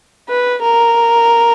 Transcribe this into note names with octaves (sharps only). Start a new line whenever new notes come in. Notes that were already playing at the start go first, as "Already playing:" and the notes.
B4
A#4